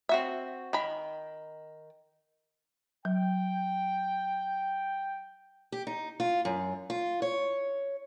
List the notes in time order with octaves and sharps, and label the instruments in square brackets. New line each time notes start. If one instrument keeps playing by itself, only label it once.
[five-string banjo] C4 F#4 E5
D#3 B5
[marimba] F#3 [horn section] G5
[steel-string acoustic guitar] G4
D#4
F4
F#2
F4
C#5